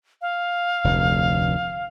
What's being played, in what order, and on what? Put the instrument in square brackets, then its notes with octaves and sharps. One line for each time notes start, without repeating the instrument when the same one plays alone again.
[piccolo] F5
[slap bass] F1 D2